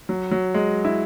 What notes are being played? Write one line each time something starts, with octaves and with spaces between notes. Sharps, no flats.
F#3
F#3
G#3
E4